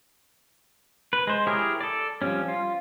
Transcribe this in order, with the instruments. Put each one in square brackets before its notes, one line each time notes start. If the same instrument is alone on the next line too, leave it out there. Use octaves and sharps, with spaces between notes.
[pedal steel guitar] B4
G#3 C5
E4 G4 G#4 A#4 C#5
A4 D5
F3 G3 C#4
F4